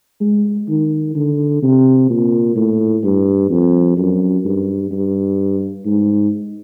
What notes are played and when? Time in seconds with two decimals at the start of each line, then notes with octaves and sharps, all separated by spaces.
0.21 G#3
0.69 D#3
1.16 D3
1.63 C3
2.10 A#2
2.56 A2
3.04 G2
3.50 F2
3.97 F#2
4.45 G2
4.91 G2
5.86 G#2